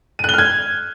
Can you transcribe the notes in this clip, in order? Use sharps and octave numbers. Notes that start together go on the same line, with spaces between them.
F6 F#6 G#6 D#7 G7